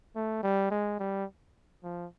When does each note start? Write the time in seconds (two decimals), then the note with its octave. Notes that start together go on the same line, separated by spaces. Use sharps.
0.16 A3
0.43 G3
0.71 G#3
0.99 G3
1.83 F3